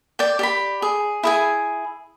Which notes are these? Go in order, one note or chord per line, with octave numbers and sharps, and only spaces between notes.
D5 G5
G4 D5 B5
G#4
E4 G#4 G#5